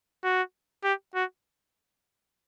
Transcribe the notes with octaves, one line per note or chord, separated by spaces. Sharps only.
F#4
G4
F#4